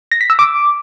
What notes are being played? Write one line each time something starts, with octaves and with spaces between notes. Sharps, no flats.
A#6
B6
E6
D6